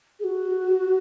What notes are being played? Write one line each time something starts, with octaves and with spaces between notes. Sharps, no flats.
G#4
F#4